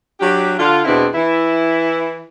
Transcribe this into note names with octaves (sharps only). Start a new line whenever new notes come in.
F#3 D4 G4
D3 F4
E2 B2 C4 D4 E4
E3 E4